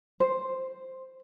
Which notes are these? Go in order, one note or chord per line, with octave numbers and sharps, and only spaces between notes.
C5